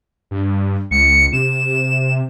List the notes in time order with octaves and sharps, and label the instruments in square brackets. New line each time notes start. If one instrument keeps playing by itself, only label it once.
[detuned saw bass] G2
[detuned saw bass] C#2 [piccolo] C#7
[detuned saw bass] C3 [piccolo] E7